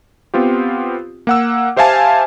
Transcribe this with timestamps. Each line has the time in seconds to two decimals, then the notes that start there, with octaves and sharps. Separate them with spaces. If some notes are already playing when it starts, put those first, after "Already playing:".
0.34 B3 C4 F4 G4
1.27 A#3 F#5 E6
1.76 G4 C5 E5 F5 G#5 A5